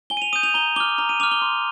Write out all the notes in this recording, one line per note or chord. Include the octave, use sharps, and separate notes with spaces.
G#5 G7
D#7
F7
D#6 G6 D#7
F7
A#5 G7
D6 F6 G7
A#5 F7
D#7
D6 F6 F7
G7
C6